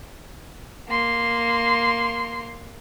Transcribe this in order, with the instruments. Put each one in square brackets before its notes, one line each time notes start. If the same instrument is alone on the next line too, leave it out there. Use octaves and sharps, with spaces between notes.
[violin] A#3 C6